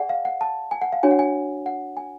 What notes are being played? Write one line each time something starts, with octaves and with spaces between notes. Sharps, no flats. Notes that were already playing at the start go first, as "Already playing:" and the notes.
Already playing: G#4 D5 F#5 G#5
F5
F#5
A5
G#5
F#5
F5
D4 F#4 C#5 G#5
F#5
G#5
F#5
G#5